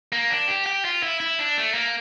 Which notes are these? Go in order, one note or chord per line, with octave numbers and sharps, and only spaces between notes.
A#3
D4
G4
G4
F4
E4
E4
D4
A3
A#3